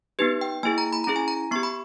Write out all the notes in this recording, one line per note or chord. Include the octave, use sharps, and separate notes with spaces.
B3 D#4 G4 B4
G5
A#3 E4 G#4 G#5
A#5
B5
C#4 E4 G#4 A#5
G#5
A#5
B3 G4 C#6
B5